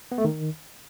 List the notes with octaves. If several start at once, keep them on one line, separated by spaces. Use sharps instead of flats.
B3
A3
D#3